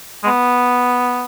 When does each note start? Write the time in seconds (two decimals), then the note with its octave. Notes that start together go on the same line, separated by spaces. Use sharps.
0.24 G#3
0.27 B3